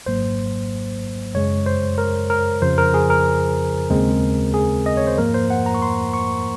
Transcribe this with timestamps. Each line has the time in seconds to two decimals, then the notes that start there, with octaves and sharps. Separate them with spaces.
0.06 G#1 G#2 F#3 A#3 C5
1.34 F#2 C#3 G#3 C#5
1.66 C5
1.98 A#4
2.30 A#4
2.62 F2 C#3 F3 C5
2.78 A#4
2.94 G#4
3.10 A#4
3.90 D#2 C#3 G#3 C4
4.54 G#4
4.86 D#5
4.97 C#5
5.07 C5
5.18 G#2 F3 A#3 A#4
5.34 C5
5.50 F#5
5.66 A#5
5.74 C#6
5.82 C6
6.14 C#6